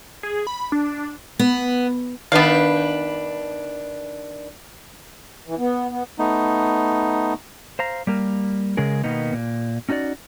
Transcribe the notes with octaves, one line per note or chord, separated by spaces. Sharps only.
G#4
B5
D4
B3
D#3 B3 D4 B4 F5
E3
B3
B3
A3 B3 D#4
C5 F5 A#5
G3 A#3 A#4
C#3 G#3 C#4 G#4 A#4
B2 D#3 A#3 B3 D#4
A#2
C#4 D#4 F#4 C5 D5